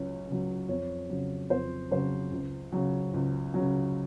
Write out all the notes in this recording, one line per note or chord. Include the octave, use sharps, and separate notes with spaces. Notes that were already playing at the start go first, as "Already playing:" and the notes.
Already playing: C#2 C#3 F#3 C#5
C#3 F#3
F2 C#5
C#3 F#3
F2 C5
C#3 F#3 C5
C#2
C#3 F#3
C#2
C#3 F#3